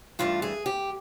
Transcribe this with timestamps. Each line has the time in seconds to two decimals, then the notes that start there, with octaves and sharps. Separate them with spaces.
0.19 G2 E3 A3 F4
0.42 G#4
0.66 G4